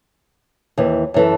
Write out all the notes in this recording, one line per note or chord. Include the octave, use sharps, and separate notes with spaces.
D#2 E3
F#2 E3 A4